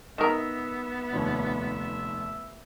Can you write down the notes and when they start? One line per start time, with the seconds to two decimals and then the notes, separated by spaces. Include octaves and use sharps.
0.18 D#3 B3 A#4 E5 D#6 A#6 E7
1.13 F1 D#2 C#5